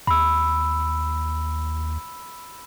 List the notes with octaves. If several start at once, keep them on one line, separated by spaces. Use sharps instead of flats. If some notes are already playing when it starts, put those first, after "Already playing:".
D#2 B5 E6